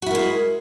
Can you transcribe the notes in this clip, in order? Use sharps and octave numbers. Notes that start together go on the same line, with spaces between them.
G#3 E4 F#4 A#4